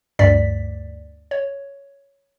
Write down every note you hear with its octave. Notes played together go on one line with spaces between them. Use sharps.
D2 G2 D5 B6
C#5